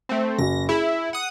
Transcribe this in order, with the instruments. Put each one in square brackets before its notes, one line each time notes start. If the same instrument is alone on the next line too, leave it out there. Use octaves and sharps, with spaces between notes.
[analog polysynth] A3 C4
[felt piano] F#1 F#3 [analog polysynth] A#6
[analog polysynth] E4 [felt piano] G#4 E7
[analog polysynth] F#5 D#6